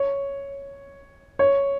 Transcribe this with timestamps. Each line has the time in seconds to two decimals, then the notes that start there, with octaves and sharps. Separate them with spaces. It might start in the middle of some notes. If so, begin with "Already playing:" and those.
Already playing: C#5
1.39 C#5